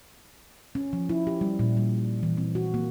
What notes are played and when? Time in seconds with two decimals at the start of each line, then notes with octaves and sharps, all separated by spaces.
0.75 C#4
0.93 F3
1.09 E4
1.27 G4
1.41 G3
1.59 A#2
1.77 G3
2.23 E3
2.37 C4
2.55 F#4
2.74 A#3